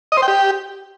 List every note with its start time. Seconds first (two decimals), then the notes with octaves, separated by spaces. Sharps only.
0.12 D#5
0.17 C5
0.22 G5
0.28 G4